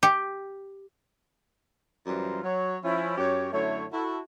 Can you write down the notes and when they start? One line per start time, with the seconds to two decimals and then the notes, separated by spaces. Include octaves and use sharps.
0.03 G4
2.07 F#2 E3 G3 F4 C5 A#5
2.43 F#3 C#5
2.83 F3 C#4 E4
3.18 F#2 G4 C#5
3.53 F#2 D3 A3 E4 C#5
3.92 E4 F#4 A4